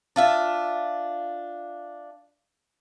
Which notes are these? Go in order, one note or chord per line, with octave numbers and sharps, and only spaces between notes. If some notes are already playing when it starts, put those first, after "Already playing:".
D4 F4 E5